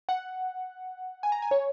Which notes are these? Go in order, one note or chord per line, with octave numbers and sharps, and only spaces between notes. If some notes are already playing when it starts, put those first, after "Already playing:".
F#5
G#5
A#5
G#5
C#5